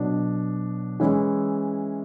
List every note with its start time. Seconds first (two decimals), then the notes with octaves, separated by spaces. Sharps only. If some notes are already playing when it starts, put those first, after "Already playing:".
Already playing: B2 F#3 B3 D4
1.00 E3 G#3 C#4 E4